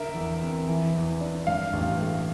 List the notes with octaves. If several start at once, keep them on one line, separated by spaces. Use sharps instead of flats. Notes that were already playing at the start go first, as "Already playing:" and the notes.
Already playing: D3 A#4 E5
E2
C4
E3
E2
D4
G2 F5
A1
A3